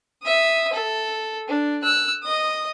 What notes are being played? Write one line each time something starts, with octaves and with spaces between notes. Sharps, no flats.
E5 D#6
A4
D4
E6 F#6
D#5 D#6